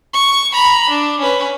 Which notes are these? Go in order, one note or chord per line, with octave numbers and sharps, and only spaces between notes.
C#6
A#5 B5
D4
C#4 B4